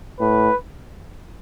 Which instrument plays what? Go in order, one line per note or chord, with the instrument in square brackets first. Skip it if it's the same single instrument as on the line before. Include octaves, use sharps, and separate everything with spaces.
[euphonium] A2 [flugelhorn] B4